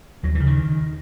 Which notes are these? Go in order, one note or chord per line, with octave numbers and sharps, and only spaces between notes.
D#2 F#3
E3
C#3
D#3